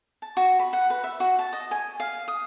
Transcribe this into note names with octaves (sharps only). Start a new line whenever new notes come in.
A5
F#4
B5
F#5
B4
E5
F#4
A5
D#5
G#5
F5
D#6